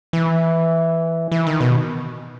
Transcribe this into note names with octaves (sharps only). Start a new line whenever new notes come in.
E3
E3
D#3
B2